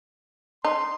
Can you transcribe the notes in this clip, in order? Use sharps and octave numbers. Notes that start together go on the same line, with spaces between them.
D#4 C6